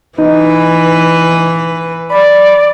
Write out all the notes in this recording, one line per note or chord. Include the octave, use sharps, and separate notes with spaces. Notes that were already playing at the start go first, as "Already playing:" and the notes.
E3 D#4 B4
D5 B5